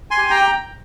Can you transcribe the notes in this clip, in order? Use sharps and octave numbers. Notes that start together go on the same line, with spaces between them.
G#5 C6
G4
G5 A#5